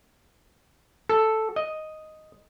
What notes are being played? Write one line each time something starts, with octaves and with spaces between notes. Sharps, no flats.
A4
D#5